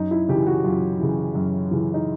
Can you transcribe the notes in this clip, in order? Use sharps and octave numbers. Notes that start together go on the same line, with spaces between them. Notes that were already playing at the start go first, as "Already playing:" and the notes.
Already playing: F#2 D#4
E4
C#3 E3 G4
F#4
F#2 F4
C#3 E3
F#2
C#3 E3
D#4